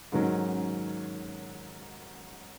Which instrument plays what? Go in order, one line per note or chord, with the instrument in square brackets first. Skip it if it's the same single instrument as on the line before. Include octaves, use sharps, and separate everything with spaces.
[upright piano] G#2 D#3 F#3 C#4